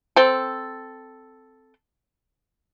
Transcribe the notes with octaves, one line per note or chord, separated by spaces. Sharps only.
C4 A4